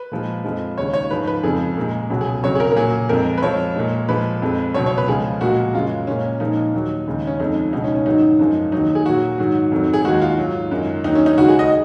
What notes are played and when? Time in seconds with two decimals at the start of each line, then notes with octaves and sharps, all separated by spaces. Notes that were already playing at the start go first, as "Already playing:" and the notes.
Already playing: B4
0.12 A#2 F3 G#3
0.44 F2 F3 G#3
0.77 D#2 C#3 G#3 C#5
0.93 C#5
1.11 G#2 F3 G#3 B4
1.27 B4
1.43 F2 C#3 F3 G#3 G#4
1.77 A#2 G#3
2.10 C#2 B2 F#3
2.21 G#4
2.43 F2 C#3 F#3 C#5
2.55 G#4
2.60 A#4
2.72 A#4
2.76 A#2 F#3 G#4
3.09 F2 F3 G#3 A#4
3.37 B4
3.42 F2 F3 G#3 C#5
3.76 A#2 G#3
4.09 A#2 F3 G#3 B4
4.42 F2 F3 G#3
4.74 C#2 B2 F#3 C#5
4.86 C#5
4.98 B4
5.08 C#2 C#3 F3 G#3 G#4
5.41 A#2 F3 G#3 F#4
5.74 F#2 C#3 G#3 F4
6.07 A#2 G#3 C#4
6.40 A#2 F3 G#3 D#4
6.74 D#2 D#3 F#3
7.07 D#2 C#3 G#3
7.27 C#4
7.40 F2 F3 G#3 D#4
7.73 C#2 B2 G#3 D#4
7.84 C#4
7.95 C#4
8.06 G#2 D#3 F#3 D#4
8.39 F#2 F3 G#3
8.72 D#2 D#3 F#3 D#4
8.95 G#4
9.06 A#2 F#3 F#4
9.38 G#2 D#3 F#3
9.72 F2 D#3 F#3
9.94 G#4
10.05 D#2 D#3 G#3 F#4
10.22 F4
10.38 G#2 F#3
10.71 F#2 D#3 G#3
11.04 D#2 D#3 F#3 D#4
11.15 C#4
11.26 D#4
11.37 C#2 C#3 G#3 F#4
11.48 G#4
11.59 D#5